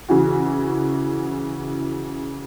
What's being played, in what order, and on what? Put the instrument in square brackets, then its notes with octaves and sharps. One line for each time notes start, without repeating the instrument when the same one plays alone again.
[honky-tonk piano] C#3 E3 F#4